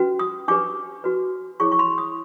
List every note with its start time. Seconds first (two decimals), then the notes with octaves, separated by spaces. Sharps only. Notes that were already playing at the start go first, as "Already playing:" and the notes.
Already playing: C#4 F#4 B4
0.19 D#6
0.48 D4 G4 B4 D6
1.04 F#4 B4
1.60 E4 G#4 C#5 C#6
1.72 C#6
1.79 C6
1.98 D#6